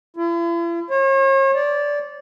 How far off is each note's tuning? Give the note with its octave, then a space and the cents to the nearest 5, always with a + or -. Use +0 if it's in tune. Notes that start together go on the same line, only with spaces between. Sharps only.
E4 +45
C#5 -40
D5 -15